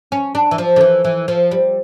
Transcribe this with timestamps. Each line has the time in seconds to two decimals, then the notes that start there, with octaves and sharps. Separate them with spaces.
0.12 C#4
0.35 D4
0.51 E3
0.58 F3
0.76 D3
0.81 E3
1.05 E3
1.28 F3
1.51 G3